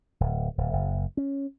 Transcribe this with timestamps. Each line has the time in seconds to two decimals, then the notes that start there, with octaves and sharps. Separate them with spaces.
0.20 D1
0.58 D1
0.73 F#1
1.17 C#4